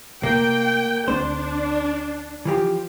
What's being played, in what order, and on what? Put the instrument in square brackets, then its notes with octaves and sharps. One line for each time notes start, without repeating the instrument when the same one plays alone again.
[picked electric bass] C3 A3 [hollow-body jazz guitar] A#3 [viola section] G5
[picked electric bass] D2 A3 C4 [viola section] D4 [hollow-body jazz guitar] C5
[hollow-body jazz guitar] E3 F3 G4